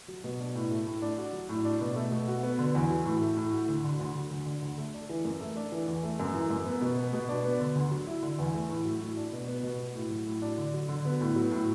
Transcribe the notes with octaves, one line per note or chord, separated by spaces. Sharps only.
F#3
B2
D4
A2
A3
A2
D4
F#4
F#3
A2
D4
B2
A3
B2
F#4
B3
D3
E2
F#3
A2
A3
A2
F#4
D2
D3
D2
F#3
D2
D3
D2
A3
D4
E3
F#2
A3
D4
E3
E2
A3
F#2
E3
F#2
B3
B2
B3
B2
D4
B3
D3
D2
F#3
E4
D3
E2
A3
A2
F#3
A2
D4
B2
B3
B2
F#4
A2
F#3
A2
D4
D3
F#3
D3
B3
A2
F#3
A2